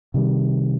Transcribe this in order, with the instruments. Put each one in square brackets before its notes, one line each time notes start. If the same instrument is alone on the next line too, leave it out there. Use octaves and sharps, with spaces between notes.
[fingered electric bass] C3 D#3 G3